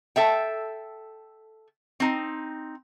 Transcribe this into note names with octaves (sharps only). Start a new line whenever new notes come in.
A4 E5 G5
C4 D#4